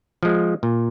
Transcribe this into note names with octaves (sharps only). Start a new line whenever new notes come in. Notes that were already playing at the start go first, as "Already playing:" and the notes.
F3 G#3
A#2